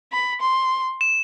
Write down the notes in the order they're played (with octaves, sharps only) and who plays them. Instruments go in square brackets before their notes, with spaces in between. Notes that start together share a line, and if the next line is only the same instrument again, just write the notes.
[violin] B5
C6
[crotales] E7